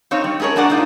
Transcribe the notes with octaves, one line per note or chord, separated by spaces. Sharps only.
C4 D#4 C#5 F5
G3
G#3 C#4 G#4 A#4 C#5
A3 A#3 D4 A#4 D5 F#5
A#3 D#4 F4